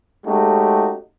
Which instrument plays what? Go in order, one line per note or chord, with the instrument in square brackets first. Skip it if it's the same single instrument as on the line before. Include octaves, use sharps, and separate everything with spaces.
[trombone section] G#3 A3 C#4 D#4 F#4 G4